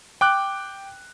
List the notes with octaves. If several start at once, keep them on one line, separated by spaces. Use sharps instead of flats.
G5 D6 F#6